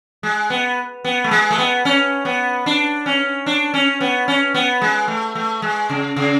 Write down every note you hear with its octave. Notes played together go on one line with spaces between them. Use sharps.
G#3
B3
B3
A3
G#3
A3
B3
C#4
B3
D4
C#4
D4
C#4
B3
C#4
B3
G#3
A3
A3
G#3
C#3
C#3